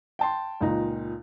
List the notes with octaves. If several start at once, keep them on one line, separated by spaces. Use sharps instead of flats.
G5 A5 C6
C#2 A#2 D#4 A#5